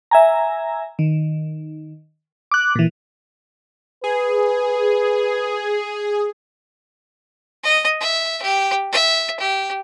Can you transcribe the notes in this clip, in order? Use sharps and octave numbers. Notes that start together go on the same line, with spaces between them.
E5 G#5 A#5
D#3
D6 F#6
A#2 E3
G#4 B4
D#5
E5
G4
E5
G4